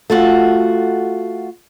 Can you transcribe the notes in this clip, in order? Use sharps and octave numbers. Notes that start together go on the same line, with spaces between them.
A3 F4 F#4